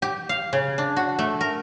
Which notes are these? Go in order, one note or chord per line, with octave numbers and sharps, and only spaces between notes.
G4
F5
C#3
D4
F#4
A3
A#4